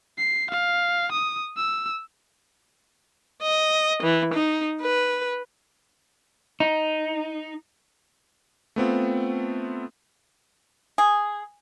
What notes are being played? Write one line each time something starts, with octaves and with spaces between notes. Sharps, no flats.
C7
F5
D#6
E6
D#5
E3
D#4
B4
D#4
A3 B3 C4 F4
G#4